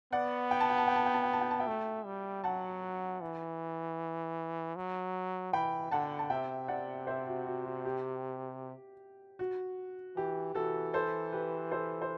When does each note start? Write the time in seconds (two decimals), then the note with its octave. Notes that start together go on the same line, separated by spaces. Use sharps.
0.12 B3 D5 F#5
0.51 G5
0.60 A5
0.70 G5
0.78 A5
0.88 G5
0.96 A5
1.06 G5
1.14 A5
1.23 G5
1.33 A5
1.41 G5
1.51 A5
1.60 E5 G5
1.67 A3
2.05 G3
2.44 F#3 F#5 A5
3.21 E3
4.76 F#3
5.53 E3 G5 B5
5.91 D3 F#5 A5
6.19 A5
6.30 C3 E5 G5
6.68 D5 F#5
7.07 C5 E5
7.27 F#4
7.46 F#4
7.66 F#4
7.85 G4
9.39 F#4
10.16 E3 G4
10.55 E3 F#4 A4
10.94 A4 C5
11.32 G4 B4
11.71 A4 C5
12.02 C5